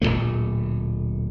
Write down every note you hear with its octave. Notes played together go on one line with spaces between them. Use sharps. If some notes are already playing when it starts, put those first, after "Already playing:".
D1 E2 A#2 A3